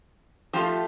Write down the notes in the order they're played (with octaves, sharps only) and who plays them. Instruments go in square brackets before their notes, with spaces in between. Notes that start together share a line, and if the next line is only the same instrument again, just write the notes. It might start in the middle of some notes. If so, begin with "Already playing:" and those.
[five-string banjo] F3 [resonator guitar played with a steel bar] A3 F4 G4